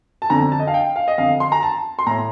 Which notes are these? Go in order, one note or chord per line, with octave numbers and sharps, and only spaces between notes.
A5
F2 D3 A#5
A5
D#5
F5
G5
F5
D#5
F2 D3 F5
C6
A#5
A5
C6
A2 A#5